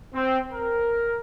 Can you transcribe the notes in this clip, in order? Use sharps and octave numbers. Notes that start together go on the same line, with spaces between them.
C4
A#4